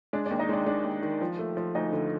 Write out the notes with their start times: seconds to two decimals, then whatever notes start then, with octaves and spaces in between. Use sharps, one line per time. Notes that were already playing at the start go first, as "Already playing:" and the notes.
0.13 G#3 D4 D5
0.26 D4 D5
0.31 D#2
0.39 D#4 D#5
0.49 G#3 D4 D5
0.66 G#3 D4 D5
0.84 D#2
1.02 D#3
1.21 F3
1.39 A3
1.57 F3
1.75 D2 D#4 D#5
1.92 D3